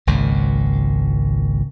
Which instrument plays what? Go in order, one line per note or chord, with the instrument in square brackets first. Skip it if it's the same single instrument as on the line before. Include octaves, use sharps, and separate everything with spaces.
[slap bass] G#1 C#2 A#2